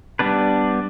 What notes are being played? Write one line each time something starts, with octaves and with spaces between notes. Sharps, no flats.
G3 B3 D4 B4